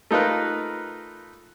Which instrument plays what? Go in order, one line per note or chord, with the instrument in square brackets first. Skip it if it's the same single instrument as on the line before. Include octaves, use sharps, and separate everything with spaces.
[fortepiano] A3 D#4 F4 A#4 B4